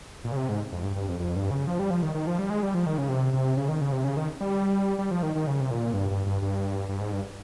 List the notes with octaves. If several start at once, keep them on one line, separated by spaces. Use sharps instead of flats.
A#2
C#3
C3
G#2
F2
G2
G2
F2
F2
G2
C#3
F3
G3
F3
D#3
D#3
F3
G3
G#3
G3
F3
D#3
C#3
C3
C3
C#3
D#3
C#3
C3
C#3
D#3
G3
G3
F3
D#3
D#3
C#3
C3
A#2
G2
G2
G2
G2
G2
G#2
G2